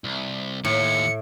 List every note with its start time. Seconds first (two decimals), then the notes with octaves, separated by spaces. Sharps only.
0.04 C2
0.65 D#2 A2 E3 C#7